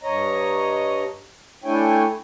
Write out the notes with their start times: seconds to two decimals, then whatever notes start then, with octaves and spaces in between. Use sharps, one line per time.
0.03 G2 C#5 D#5 A#5
1.64 A3 D4 E4 C#5 G5 G#5